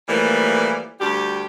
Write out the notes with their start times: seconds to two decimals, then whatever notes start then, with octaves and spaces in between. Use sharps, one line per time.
0.09 E3 F3 G3 A3 A#3
0.99 D2 G3 G4